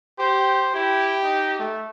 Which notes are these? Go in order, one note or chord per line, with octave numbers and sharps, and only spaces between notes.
G4 C5
E4 G4
D#4
A3